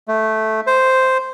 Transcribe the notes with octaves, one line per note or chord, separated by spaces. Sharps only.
A3
C5